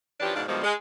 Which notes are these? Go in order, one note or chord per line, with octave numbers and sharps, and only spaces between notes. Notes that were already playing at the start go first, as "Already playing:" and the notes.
E3 F3 C#4 D4 G4
G#2 B2 D#3 D4 D5 F5
B2 D3 D#3 F3 G3 G#3
G#3